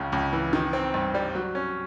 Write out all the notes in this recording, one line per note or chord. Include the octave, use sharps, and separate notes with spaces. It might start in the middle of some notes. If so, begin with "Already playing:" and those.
Already playing: C#2 C#3
C#2
E3
D#3
C4
G2
G3
F#3
C#4